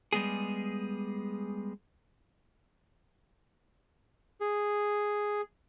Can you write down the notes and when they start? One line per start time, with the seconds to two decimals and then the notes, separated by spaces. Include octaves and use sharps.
0.13 G3 G#3 B3 G#4
4.41 G#4